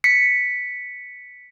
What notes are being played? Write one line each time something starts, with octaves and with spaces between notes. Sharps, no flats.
B6 C#7